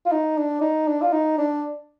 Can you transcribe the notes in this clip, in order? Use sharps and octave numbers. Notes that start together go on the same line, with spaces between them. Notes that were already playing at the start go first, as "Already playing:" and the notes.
F4
D#4
D4
D#4
D4
F4
D#4
D4